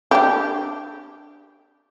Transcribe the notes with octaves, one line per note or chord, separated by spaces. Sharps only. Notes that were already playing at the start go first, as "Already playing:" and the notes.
D4 G4